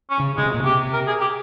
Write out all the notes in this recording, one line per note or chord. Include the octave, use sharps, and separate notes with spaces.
C#4
C#3
C#3 G#3
C3
A#2
C3 G4
A#4
G#4
G4